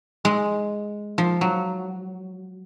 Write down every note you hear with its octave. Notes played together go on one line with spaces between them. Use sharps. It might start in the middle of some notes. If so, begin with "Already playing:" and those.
G#3
F3
F#3